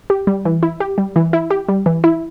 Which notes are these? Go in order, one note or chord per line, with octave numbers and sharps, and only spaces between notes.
G4
G3
E3
E4
G4
G3
E3
E4
G4
G3
E3
E4